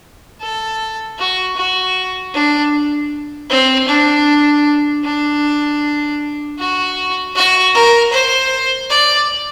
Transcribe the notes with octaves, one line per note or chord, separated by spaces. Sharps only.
A4
F#4
F#4
D4
C4
D4
D4
F#4
F#4
A#4
C5
D5